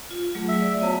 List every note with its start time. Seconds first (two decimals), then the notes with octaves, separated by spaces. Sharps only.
0.11 F4
0.35 F#3 A3 G#4
0.49 E5
0.61 D5
0.81 F#3 B3 A5